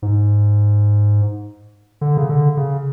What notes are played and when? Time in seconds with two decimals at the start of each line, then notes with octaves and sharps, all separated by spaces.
0.02 G#2
2.01 D3
2.17 C#3
2.29 D3
2.57 C#3